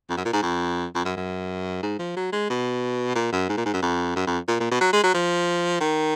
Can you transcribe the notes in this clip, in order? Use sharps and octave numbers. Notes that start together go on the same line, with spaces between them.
F2
F#2
A#2
G#2
F2
F2
F#2
F#2
G#2
F3
F#3
G#3
B2
A#2
F#2
G#2
A#2
G#2
F#2
F2
F#2
F2
A#2
A#2
B2
F#3
G#3
F#3
F3
D#3